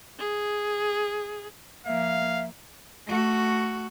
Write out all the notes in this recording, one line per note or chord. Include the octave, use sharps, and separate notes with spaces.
G#4
F3 A#3 E5 F5
A3 F#4